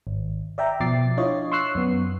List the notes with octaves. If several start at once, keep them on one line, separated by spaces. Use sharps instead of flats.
G#1
D5 E5 G5 A#5
B2 F3 D6 A6 C7
D4 E4 F4 C#5 D#5
C6 C#6 E6 F#6 C7
F#2 B3